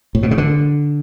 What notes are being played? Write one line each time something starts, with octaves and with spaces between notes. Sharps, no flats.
A2
B2
C#3
D3